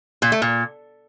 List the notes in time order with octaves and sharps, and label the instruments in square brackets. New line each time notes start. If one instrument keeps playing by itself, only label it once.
[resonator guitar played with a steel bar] A#2
A3
A#2